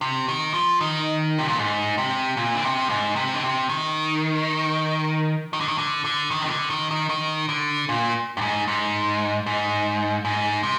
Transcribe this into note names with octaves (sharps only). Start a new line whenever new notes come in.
C3
D#3
F3
D#3
C3
A#2
G#2
C3
A#2
D3
C3
G#2
C3
D3
C3
D#3
D#3
D3
D#3
D3
D3
D#3
C3
D3
D#3
D#3
D#3
D3
A#2
G2
G#2
G#2
G#2
G#2
C3